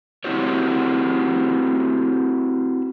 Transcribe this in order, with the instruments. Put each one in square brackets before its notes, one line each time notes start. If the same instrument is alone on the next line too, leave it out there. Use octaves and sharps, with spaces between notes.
[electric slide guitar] C4 E4 F#4 G4 C#5